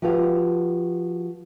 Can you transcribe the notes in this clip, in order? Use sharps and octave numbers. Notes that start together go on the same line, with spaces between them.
F3 F#4 G4 B4 F5